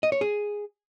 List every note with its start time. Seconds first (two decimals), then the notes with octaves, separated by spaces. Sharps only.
0.03 D#5
0.12 C#5
0.21 G#4